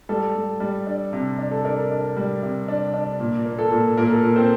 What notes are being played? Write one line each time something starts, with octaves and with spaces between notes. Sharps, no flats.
G3 A4
G3
G3
D4
C3
D4
A4
D4 A#4
D4
G3
C3
D4
D4
A#2
A#3
A4
A#2
A#2 A#4
A4
A#4
A#2
C4 C5